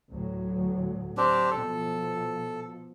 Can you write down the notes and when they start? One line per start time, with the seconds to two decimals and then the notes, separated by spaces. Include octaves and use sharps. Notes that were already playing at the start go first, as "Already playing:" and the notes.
0.11 D2 A2 F#3
1.17 C4 D4 G4
1.51 B2 F3 A4